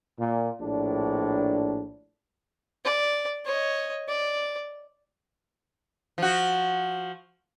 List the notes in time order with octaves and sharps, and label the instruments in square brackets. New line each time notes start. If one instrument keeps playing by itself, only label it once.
[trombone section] A#2
A#1 A2 D4
[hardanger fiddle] D5
C#5 D#5
D5
[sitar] F3 F#4